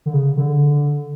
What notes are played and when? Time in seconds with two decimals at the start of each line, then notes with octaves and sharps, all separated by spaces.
0.06 D3
0.13 C#3
0.37 D3